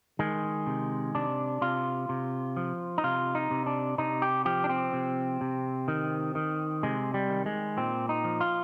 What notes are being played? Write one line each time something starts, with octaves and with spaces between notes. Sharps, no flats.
D#3 G#3
C3
C3 D4
C3 F4
C3
F3
D#4
C3 F4
D#4
C3
D4
C3 D#4
G4
F3 G4
D4
C4
C3
C3
D#3
D#3
C3 G#3
G3
D#3
G#3
A#2 C4
D#4
F3
F4